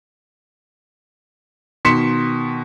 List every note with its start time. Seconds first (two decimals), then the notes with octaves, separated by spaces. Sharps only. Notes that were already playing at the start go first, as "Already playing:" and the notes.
1.85 B2 D#3 C6 B6 C#7 E7